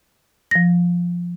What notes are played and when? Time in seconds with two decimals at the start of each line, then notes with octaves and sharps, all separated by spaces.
0.51 F3 A#6